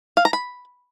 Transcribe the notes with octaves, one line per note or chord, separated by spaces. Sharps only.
F5
A#5
B5